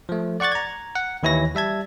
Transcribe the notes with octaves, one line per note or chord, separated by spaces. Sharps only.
F3 A3
D5 F#5 C#6 F#6 A6
A#5 G#6
F#5
D#2 E3 E4 C#5 A#6
G3 E5 A5 G#6